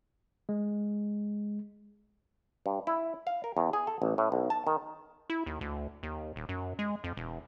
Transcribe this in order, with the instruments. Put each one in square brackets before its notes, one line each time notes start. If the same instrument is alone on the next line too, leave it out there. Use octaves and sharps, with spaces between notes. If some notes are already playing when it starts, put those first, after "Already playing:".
[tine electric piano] G#3
[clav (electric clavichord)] G2
E4
F5
A#4
E2
G#4
A4
A1
A2
B1
A5
D#3
[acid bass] E4
D#2
D2
D#2
D#1
F#2
G#3
F2
E1